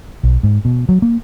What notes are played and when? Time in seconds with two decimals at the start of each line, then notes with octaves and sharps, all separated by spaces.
0.23 B1
0.43 G#2
0.65 B2
0.89 F#3
1.02 A#3